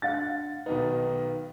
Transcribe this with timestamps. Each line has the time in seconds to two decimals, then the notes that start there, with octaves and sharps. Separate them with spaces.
0.02 D4 F5 F#5 A6
0.66 B1 D#3 D#4 B4